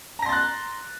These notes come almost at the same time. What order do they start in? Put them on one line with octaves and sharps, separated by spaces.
A#5 A#6 C6 A6 F#6